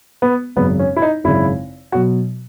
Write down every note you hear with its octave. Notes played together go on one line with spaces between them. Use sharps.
B3
G#1 F#2 C#3 B3
C#4
E4
D#4
G#1 F#2 C#3 E4
B2 F#3 F#4